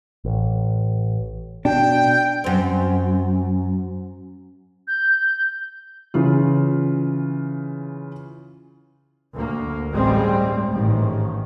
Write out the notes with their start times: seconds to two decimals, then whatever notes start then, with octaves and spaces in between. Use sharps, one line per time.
0.25 A1
1.65 B2 D4 G5
2.44 F#2 C4
4.88 G6
6.14 C#3 E3 F4
9.34 D2 A#3
9.92 A1 G2 G3 G#3 C4
10.71 A1 G#2 D#3